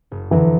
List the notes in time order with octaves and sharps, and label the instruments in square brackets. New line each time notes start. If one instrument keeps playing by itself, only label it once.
[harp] F#1
[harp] F2 D3 F#3 [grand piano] E3